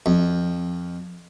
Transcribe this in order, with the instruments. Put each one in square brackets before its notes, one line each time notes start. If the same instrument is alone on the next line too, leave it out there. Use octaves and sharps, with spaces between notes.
[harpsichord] F2